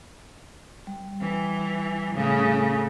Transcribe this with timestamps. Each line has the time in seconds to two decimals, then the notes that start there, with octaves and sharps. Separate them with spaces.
0.87 G3
1.20 E3
2.14 A2 C#3